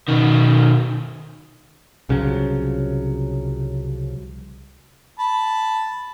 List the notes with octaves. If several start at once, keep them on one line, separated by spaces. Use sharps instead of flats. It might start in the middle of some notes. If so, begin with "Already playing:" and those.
B2 D#3
C2 C#3 F3 F#3
A5 B5